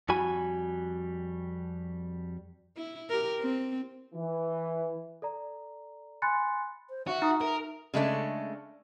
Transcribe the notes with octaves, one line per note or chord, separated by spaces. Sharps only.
F2 G3 F#4 G#5 B5
E4
G4 A#4
C4
E3
A4 D5 A#5
G#5 B5 C6 F#6 A6 C#7
C5
F#4 E5
D#4 A#5 D#6
A#4 E5
C#3 G#3 A3 D4